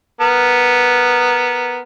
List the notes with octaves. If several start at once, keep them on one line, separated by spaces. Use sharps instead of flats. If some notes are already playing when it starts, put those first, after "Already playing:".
B3 A#4